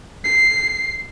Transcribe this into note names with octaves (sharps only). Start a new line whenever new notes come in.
C7